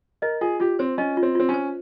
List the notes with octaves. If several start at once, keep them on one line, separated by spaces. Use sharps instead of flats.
A#4 D#5
F4 G#4
F4 G4
C4 C5
C#4 D#5
F4
C4
C4 F4
C#4
C5